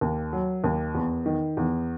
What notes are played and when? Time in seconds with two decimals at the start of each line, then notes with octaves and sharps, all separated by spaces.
0.01 D#2
0.33 F#3
0.64 D#2
0.95 E2
1.26 D#3
1.57 E2